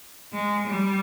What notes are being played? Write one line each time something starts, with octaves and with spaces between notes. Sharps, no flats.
G#3
G3